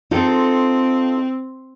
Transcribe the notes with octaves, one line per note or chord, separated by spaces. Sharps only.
C4 D#4 F4 A4